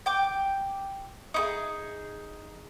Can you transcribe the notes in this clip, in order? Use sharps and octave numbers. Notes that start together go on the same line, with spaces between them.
G5 D6
D#4 E4 G#4